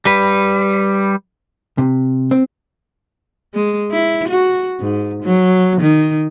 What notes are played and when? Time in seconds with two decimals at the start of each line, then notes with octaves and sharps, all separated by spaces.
0.05 G3 B4
1.78 C3
2.31 C4
3.54 G#3
3.92 E4
4.28 F#4
4.80 G#2
5.23 F#3
5.81 D#3